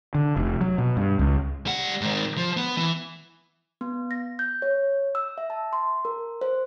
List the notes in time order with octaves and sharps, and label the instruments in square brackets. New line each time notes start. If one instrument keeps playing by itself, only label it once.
[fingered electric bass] D3
F1
F#3
B2
G2
C#2
[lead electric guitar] G3 F#5
G#2 D#3
F3
B3
E3
[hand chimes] B3
A#6
G6
C#5
E6
E5
A5
C6
A#4
C5